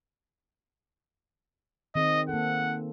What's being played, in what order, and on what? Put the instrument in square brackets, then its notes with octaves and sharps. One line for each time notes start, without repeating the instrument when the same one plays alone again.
[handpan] D#3 C4 G#4 [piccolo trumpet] D#5
[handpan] A#3 A4 [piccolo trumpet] F#5